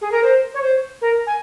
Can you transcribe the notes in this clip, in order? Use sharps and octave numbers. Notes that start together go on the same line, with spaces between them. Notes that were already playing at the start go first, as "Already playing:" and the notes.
G#4
A#4
C5
C#5
C5
A#4
G#5